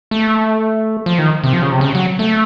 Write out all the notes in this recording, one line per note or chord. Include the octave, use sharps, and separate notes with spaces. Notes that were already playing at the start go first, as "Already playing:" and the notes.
A3
F3
D#3
C3
F3
C#3
C3
C#3
F#3
A3